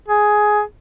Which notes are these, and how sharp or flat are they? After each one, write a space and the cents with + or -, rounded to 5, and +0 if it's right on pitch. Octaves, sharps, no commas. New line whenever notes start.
G#4 +10